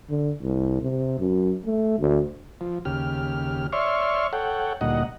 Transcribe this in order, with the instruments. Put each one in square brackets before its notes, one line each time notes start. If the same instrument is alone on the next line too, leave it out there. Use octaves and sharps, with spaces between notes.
[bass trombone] D3
C2
C3
F#2
A3
D2
[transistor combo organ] F3
D#2 C#3 G4 F6
C#5 D5 E5 C6 C#6 F6
A4 C#5 F#5 G5
D2 A#2 G3 D#4 D#5 F#5